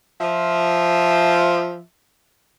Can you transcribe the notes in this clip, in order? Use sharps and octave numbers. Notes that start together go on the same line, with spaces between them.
F3 E5